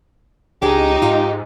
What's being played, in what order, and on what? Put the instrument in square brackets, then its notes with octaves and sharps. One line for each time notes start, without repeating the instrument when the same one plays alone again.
[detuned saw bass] C#2 [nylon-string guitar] D4 G#4 [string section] D#4 [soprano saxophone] G4
[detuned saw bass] G#2 [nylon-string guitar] F4